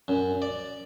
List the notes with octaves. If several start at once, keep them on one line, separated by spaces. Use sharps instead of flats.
F#2
D5